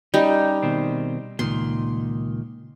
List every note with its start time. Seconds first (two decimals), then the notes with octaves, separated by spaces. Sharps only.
0.14 G3 C#4 D#4
0.63 B2 D#3 C4
1.39 C#2 A#2 D#3 C6